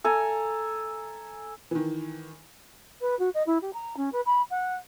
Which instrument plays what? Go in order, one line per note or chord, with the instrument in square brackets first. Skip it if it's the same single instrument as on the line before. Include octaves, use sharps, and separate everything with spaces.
[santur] A4 G#5 A#5
[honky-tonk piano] D#3 E3
[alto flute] B4
F#4
D#5
E4
G4
A#5
C#4
B4
B5
F#5